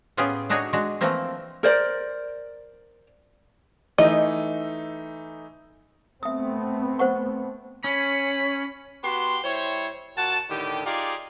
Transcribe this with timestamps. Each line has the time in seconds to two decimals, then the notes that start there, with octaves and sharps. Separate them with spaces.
0.17 A2 B3 C#4 F4 G4 G#4
0.49 A3 D4 D#4 F#4 G#4 C#5
0.73 G#3 D4 F#4
1.01 E3 F3 A3 A#3 C4
1.63 A#4 C5 D5
3.98 E3 A3 D#4 D#5
6.23 A3 B3 C4 E5 D#6
6.99 C5 F#5 C#6
7.84 C#4 B5
9.03 B3 F#4 G4 C6
9.44 G3 E4 C5 C#5
10.17 A#2 F#4 F#5 A5
10.50 A2 D3 D#3 G4
10.86 D#4 F4 G4 G#4 D5 F5